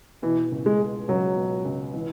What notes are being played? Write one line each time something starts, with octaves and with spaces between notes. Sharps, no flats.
B2 E3
C#2
G#3
G#3
C#2 F#3
B2
C#2
E3